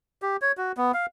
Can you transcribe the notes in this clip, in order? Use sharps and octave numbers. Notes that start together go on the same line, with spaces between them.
G4
C#5
F#4
B3
F5